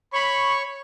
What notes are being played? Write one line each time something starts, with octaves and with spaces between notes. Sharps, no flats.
C#5 B5 C#6